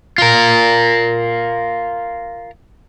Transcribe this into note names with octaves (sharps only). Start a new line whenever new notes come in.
F4 A#4